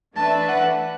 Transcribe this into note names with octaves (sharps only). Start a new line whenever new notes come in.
E3 A3 D4 B4 E5 A5
F#5